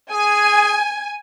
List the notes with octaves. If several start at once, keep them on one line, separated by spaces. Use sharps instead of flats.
G#4 G#5